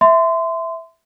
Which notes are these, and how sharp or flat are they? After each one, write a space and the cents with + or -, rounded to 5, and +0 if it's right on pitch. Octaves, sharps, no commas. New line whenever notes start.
E5 +0 C6 -25